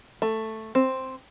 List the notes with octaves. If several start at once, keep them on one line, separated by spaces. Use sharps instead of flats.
A3
C4